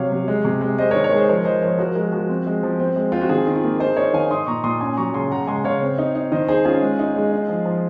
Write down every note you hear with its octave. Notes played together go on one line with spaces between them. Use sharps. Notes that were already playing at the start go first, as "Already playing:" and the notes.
Already playing: C3 F#3 C#5 F5
F#3
G#3
C3
G#3
G#3 C5 D#5
A#4 C#5
D#3
A#4 C#5
G#3 G#4 C5
F3 A#4 C#5
F3 C5 D#5
F3 A#4 C#5
F3 F#4 A#4
G#3 F#4 A#4
F3 F#4
C4
G#3
F3
C4
G#3
C4 F4
F#4
D#3 F4 G#4
D#3
F4
A#3
D#4 G#4 C5
D#4 A#4 C#5
D#3 F5 G#5
D#4 C6 D#6
A#2 A#5 C#6
A#2 C6 D#6
C#4 G#5 C6
F#3 A#5 C#6
C#3 G#5 C6
C#3 F#5 A#5
G#3 G#5 C6
C#3 C#5 F5
C4
D#4
D#4
D#3 C5 D#5
D#3 G#4 C5
C#4 F4 G#4
G#3
D#4
G#3
D#4
F3
F3